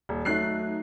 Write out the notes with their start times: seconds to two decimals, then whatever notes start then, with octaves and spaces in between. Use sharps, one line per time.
0.09 D#1
0.25 F#3 A3 D#4 F#6 C7